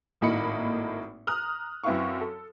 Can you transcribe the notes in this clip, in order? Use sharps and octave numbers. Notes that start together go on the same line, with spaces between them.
G#1 A2 A#3 D#4 B5 C#7
A#5 D#6 F6 F#6
F#2 C4 E4 B4 F5 C#6
A4